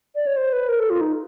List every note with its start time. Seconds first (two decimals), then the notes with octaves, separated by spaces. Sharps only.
0.15 D5
0.27 C#5
0.37 C5
0.53 B4
0.69 A#4
0.79 A4
0.90 F4
1.01 D#4